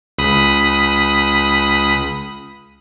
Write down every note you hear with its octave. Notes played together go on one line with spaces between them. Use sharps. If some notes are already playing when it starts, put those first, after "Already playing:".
C#2 B5 D#6